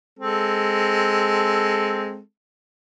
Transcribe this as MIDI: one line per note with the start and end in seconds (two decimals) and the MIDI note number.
0.19 2.19 56
0.19 2.19 60
0.19 2.19 69